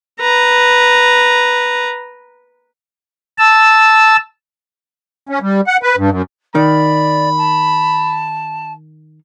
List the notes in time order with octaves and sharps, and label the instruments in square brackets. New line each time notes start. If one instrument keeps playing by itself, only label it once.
[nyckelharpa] B4 A#5
[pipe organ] A5 E6
[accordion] C#4
G3
F#5
B4
G2
F#2
[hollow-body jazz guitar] D#3 [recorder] D5 [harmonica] B5
[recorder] A5